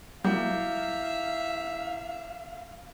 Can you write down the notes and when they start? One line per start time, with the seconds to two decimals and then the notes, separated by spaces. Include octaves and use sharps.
0.24 F#3 G3 A#3 E4 E5 F5 D6 G6